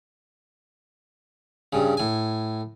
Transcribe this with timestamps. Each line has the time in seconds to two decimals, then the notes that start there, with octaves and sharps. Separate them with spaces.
1.73 G2 C#3
1.97 A2 G#5